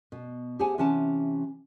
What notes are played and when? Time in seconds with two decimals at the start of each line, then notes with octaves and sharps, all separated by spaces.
0.12 B2
0.59 G4 G#4 C5 F#5 G#5 A5
0.78 C3 E3 C#4 F#5 A5